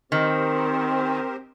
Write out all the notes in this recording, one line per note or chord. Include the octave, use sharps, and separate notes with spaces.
D#3 C4 G4 A#4 C5